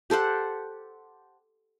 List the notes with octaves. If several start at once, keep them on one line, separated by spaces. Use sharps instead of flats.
G4 A4 C5 F#5